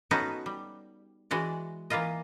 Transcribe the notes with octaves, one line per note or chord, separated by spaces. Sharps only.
B3 C#4 D#4 F#4 A4 B4
G3
E3 G#3 F#4 D5
E3 A#3 E4 F4 D#5